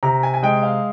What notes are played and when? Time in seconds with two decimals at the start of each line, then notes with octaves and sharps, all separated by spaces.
0.03 C3 A#5
0.23 G#5
0.34 G#5
0.43 G#3 G5
0.63 F5